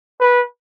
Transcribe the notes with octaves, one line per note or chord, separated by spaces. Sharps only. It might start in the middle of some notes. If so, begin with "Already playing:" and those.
B4